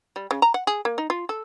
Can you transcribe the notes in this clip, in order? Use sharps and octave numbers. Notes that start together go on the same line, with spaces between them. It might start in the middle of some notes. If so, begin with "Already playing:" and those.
G3
C#3
A#5
F#5
G#4
A#3
D#4
F4
A4